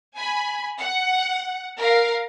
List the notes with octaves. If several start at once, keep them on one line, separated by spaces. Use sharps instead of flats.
G#5 B5
F#5
A#4 F5